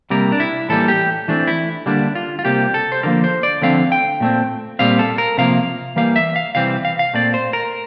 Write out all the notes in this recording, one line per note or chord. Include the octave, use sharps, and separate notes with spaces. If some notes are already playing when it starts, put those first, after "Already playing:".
C3 G3 A#3 A#4
D4
E4
A2 E3 G3 A#3 A4
G4
E3 A3 C4 D4
E4
D3 G3 A#3 D4
F4
F4
C3 G3 A#3 G4
A4
C5
D3 F3 A#3 A#4
C5
D5
D3 F3 A3 C4 F5
G5
A#2 A3 C4
A#2 G3 C4 F5
A4
A#4
C3 F3 A#3 F5
E3 G3 A#3 F5
E5
F5
C3 E3 G3 C4 F5
F5
F5
A#2 A3 C4 D5
C5
A#4